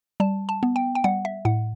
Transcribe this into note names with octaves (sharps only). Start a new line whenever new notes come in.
G3 A5
A5
B3
G5
G5
G3 F#5
E5
A2 F#5